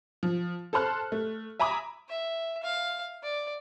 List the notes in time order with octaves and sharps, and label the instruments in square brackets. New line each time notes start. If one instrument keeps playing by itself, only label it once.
[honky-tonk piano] F3
A4 C5 A5 C6 F6 F#6
A3
E5 G#5 A#5 B5 D6 D#6
[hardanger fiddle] E5
F5
D5